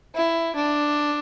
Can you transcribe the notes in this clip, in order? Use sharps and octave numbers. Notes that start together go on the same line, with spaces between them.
E4
D4